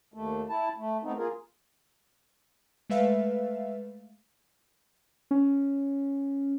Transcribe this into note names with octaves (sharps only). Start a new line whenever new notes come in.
D#2 A3
E4 A5
A3
A3 B3 C4 D#4
A#3 F4 G#4 A#4
G#3 A3 B4 E5 F5
C#4